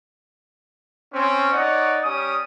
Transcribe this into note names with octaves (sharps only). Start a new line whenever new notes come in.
C4 C#4
D#4 C#5 D5 F#5
G3 C#4 D#6